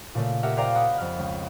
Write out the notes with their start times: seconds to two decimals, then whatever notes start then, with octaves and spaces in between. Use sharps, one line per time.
0.15 A#2 C#3 A3
0.43 G4 A#4 E5 F#5
0.57 A#4 C5 D5 F5 G5 A#5
0.75 D#5 F#5 B5 D#6
0.98 F2 F6
1.19 C#2